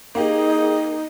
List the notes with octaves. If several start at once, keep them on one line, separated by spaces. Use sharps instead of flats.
A#3 D#4 G4 G#4 D#5